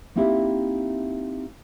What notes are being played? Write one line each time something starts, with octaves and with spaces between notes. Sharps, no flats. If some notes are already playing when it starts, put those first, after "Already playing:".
A#3 C4 D#4 E4 G4 E5